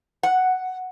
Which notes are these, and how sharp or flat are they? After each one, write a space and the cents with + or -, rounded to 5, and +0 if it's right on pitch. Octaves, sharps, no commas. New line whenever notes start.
F#5 +5